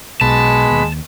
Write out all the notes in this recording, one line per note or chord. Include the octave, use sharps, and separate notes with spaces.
B1 B2 G#3 A5 B5
D#2